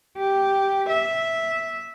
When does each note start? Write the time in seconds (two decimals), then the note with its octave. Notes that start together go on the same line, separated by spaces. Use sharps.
0.18 G4
0.89 E5